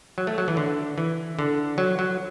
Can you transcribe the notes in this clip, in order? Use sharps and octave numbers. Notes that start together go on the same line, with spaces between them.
F#3
A3
F#3
E3
D3
E3
D3
F#3
F#3